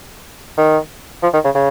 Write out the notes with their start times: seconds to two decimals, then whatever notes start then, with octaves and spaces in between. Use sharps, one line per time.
0.58 D#3
1.23 F3
1.33 D#3
1.45 C#3
1.55 C#3